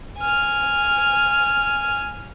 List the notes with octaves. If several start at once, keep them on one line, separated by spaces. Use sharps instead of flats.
G#5 F6